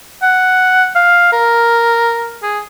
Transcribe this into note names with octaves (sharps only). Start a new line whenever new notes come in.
F#5
F5
A#4
G#4